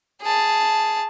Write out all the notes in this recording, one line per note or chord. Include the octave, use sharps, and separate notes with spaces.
G#4 A5